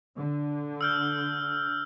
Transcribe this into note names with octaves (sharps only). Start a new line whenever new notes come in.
D3
E6 F6 G6